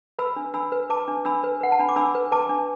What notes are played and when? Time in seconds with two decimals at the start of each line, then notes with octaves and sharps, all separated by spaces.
0.19 B4 B5 E6
0.36 D4
0.54 D4 B5 E6
0.72 B4
0.90 B4 A5 D6
1.08 D4
1.25 D4 B5 E6
1.44 B4
1.61 B4 F#5
1.72 A5
1.79 D4 B5
1.89 D6
1.96 D4 B5 E6
2.15 B4
2.32 B4 A5 D6
2.49 D4